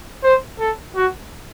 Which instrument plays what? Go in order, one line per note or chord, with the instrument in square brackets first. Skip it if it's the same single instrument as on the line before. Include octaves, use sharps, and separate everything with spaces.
[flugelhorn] C5
A4
F#4